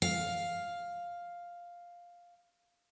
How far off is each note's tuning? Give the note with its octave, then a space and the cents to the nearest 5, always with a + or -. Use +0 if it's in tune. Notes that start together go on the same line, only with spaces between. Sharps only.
F5 +5